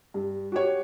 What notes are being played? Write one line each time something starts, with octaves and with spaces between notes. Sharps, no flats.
G2
F#4 G4 C#5